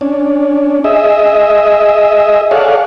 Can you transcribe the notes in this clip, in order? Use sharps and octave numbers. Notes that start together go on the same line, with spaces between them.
C#4 D4
G#4 D#5 E5
G#4 A4 C#5 D5 F5 F#5